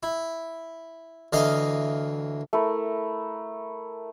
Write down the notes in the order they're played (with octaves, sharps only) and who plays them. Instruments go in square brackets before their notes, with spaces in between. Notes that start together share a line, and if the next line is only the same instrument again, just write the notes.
[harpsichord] E4
D2 E3 D#5 F5
[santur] A3 E4 A#4